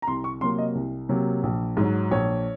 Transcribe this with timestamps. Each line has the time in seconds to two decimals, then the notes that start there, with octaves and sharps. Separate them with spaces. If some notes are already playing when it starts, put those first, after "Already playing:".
0.02 A#5
0.07 C2 C6
0.24 C#6
0.41 C3 F#3 A#3 C6
0.58 D#5
0.75 C2
1.09 C3 F#3 A#3
1.43 A#1
1.77 G#2 F#3
2.11 A#1 C#5